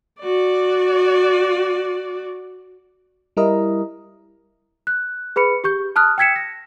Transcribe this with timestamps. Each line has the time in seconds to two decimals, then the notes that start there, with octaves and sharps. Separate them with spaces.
0.21 F#4 D5
3.37 G3 E4 A#4 D#5
4.87 F#6
5.36 G#4 B4 B5 C#7
5.64 G4 C#6 G6
5.96 A5 D#6 F6 F#6
6.18 G5 E6 G#6 B6 C#7 E7
6.36 A#6